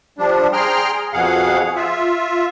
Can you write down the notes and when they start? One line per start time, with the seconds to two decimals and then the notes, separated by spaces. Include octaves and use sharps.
0.19 F3 G3 D4
0.53 G#4 G5 A#5 C6 F6
1.13 F2 B2 G#4 F5 F#5
1.76 F4 E5